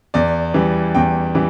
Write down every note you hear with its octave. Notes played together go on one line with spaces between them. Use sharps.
E2 D5
E3 G3
E2 G5
E3 G3